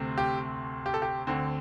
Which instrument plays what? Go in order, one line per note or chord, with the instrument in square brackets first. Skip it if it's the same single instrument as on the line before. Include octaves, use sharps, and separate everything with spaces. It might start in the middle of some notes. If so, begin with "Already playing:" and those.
Already playing: [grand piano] D2 C3 A3 C4
G4
G4
A4
G4
D2 D3 C4